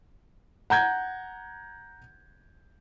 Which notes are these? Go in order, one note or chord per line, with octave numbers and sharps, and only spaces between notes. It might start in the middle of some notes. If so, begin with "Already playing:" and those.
F#5 A#5 G6 G#6